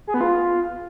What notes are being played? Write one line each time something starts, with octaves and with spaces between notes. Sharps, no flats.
G#4
B3
F4